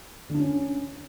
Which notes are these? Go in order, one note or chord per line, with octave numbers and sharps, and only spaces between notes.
D3
D4
C#4